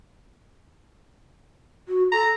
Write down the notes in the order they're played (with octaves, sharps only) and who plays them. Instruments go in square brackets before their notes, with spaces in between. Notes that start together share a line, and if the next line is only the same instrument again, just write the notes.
[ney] F#4
[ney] A4 [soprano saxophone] A#5